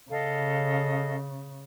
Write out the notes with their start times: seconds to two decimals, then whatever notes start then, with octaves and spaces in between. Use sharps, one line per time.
0.10 C#3 A4 D#5 F5